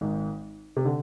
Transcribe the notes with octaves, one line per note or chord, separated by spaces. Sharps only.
G#1 G#2
C3
D3